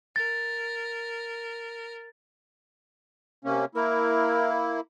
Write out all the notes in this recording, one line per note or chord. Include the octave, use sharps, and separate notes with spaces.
A#4 A6
C3 A#3 C#4
A#3 E4 A#4